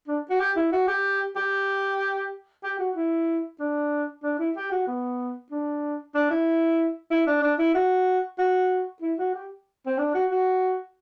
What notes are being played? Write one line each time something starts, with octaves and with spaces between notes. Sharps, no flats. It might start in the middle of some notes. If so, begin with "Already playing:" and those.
D4
F#4
G4
E4
F#4
G4
G4
G4
F#4
E4
D4
D4
E4
G4
F#4
B3
D4
D4
E4
E4
D4
D4
E4
F#4
F#4
E4
F#4
G4
C4
D4
F#4
F#4